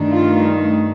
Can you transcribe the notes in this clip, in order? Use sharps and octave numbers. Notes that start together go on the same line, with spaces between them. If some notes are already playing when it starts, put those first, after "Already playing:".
Already playing: G2 D#3 A3 D4
F4